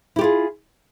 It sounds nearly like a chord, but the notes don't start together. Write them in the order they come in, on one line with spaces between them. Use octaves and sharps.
E4 G4 F4 G#4